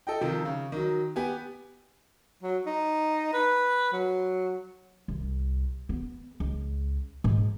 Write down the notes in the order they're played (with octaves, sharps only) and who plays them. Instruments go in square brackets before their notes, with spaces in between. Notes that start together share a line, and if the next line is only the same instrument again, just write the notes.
[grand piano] A4 D#5 G5
C3 D#3 F3
C#3
D#3 F#3
B3 G4 G#5
[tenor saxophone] F#3
D#4
B4
F#3
[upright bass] C2
B3
C#2
G#2